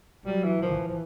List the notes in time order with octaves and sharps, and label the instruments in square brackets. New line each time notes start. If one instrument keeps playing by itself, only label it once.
[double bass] F#3 [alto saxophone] G3
[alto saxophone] E3
[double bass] E3 [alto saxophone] F3
[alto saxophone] F3